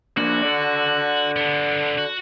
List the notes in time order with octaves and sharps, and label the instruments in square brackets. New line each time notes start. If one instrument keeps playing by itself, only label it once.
[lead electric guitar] A#3 D4 [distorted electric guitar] F#4
[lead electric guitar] A4 D5
[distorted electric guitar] D3 B3
F#4